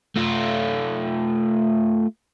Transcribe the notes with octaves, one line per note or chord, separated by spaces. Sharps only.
A3 F4